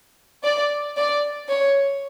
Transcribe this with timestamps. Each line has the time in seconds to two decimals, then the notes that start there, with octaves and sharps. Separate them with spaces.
0.44 D5
0.97 D5
1.49 C#5